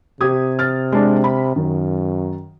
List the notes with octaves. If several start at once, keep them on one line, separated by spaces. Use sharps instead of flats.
C3 G4 D#6 G#6
F6 A6
G#3 D4 D5
B5
F#2 D#3